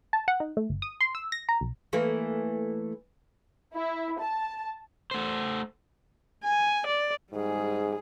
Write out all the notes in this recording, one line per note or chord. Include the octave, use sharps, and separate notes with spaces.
A5
F#5
D#4
A3
G1
D#6
C6
E6
A#6
A#5
B1
E3 A3 A#3
E4
A5
A3 C5
G#5
D5
G#2 G3 G#4